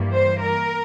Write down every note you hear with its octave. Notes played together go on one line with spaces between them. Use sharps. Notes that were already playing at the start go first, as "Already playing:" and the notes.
Already playing: G2 E3 G3 A#3
C5
A#4